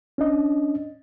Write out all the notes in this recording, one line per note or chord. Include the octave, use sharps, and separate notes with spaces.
C#4 D4 D#5